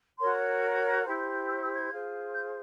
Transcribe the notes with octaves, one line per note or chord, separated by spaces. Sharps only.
F#4 A#4 C#5 C6
E4 G4 C5
E6
E6
G#6
F4 G#4 C5
G6